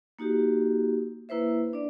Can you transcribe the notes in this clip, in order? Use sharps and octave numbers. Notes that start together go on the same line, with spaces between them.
A#3 D#4 F#4 G4
A#3 E4 B4 C5 E5
D4 D5